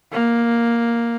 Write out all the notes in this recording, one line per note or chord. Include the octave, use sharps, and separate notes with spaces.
A#3